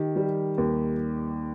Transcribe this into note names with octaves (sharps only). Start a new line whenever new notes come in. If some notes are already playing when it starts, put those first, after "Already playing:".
Already playing: D#3 G4
G3
D#2